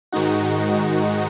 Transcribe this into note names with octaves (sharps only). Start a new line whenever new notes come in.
G#2 D#3 G#3 D#4 F#4